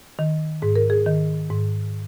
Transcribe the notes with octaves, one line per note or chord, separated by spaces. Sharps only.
D#3
G#2 G#4
A#4
G#4
D#3
G#2